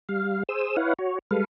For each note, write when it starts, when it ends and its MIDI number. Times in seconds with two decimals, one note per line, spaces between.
0.09 0.43 55
0.09 0.43 77
0.49 0.76 68
0.49 0.76 72
0.49 0.76 87
0.49 0.76 88
0.77 0.93 64
0.77 0.93 71
0.77 0.93 73
0.77 0.93 77
0.77 0.93 78
0.99 1.19 66
0.99 1.19 73
1.31 1.44 55
1.31 1.44 56
1.31 1.44 69
1.31 1.44 71
1.31 1.44 77